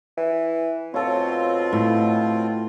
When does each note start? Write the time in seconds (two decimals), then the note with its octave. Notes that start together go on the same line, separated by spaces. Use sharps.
0.17 E3
0.94 B2 C4 F4 A4 C#5
1.73 A2 G5